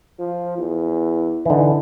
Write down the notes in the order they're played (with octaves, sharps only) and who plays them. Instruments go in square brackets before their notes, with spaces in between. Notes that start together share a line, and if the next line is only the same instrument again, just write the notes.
[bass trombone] F3
E2
[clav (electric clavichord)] D3 E3 [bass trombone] D#4